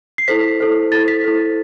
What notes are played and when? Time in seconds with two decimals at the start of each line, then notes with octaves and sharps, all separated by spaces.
0.18 C7
0.28 E4 A4 C5 B6
0.60 E4 A4 C5
0.92 E4 A4 C5 A6
1.08 B6
1.25 E4 A4 C5